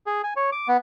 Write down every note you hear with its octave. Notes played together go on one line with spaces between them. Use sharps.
G#4
G#5
C#5
D6
B3